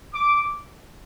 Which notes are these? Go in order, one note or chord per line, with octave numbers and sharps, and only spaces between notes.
D6